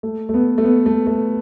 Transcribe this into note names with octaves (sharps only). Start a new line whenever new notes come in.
A3
A3
B3
A3
B3
A3
A3